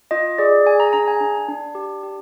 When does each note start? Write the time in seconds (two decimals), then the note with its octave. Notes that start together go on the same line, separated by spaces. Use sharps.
0.11 F4 D#5
0.38 G#4 D5
0.66 G#4 G#5
0.80 A#5
0.93 D4 A#5
1.08 G#5
1.21 D4
1.48 D4
1.75 G4
2.03 G4